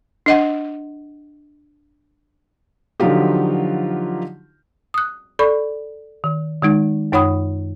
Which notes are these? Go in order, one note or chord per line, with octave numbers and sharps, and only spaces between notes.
D4 D#5 F#5
D3 F3 F#3 D#4 F4 G4
D#6 F#6
A4 D5 B5 C#6
D#3
D#3 G#3 D#4
F#2 D#4 C#5 F#5 B5 D#6